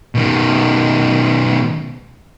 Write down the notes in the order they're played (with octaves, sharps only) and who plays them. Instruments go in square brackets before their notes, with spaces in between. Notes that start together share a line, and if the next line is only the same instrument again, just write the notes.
[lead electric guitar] B2 D#3